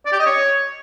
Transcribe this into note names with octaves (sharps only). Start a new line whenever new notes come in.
D5
G4
D#5
C#5